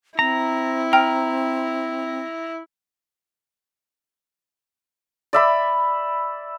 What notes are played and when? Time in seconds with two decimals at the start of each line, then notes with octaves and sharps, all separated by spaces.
0.19 C4 E4 A#5
0.93 G5 A#5 F6
5.33 D5 E5 B5